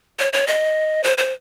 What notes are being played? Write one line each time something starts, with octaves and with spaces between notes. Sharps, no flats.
C#5
C#5
D#5
C5
C5